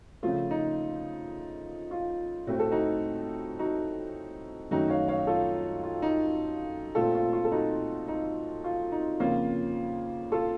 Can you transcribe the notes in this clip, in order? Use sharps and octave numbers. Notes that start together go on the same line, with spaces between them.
C#3 F3 A3 F4
D#4
F4
A2 A3 C4 F#4
A4
D#4 F#4
D#4 F#4
F#2 D#3 F#3 A3 C#4 D#4 F#4
C#5 F5
C#5 F5
F4 A4
F4
D#4
A#2 A3 C4 F4 A4
F4
F4
A4
D#4 F#4
D#4
F4
D#4
F2 C#3 F3 A#3 C#4 F4
F4 A4